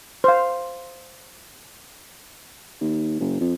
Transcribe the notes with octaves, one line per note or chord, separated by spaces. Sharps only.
C5 F5
D#2
F#1
F2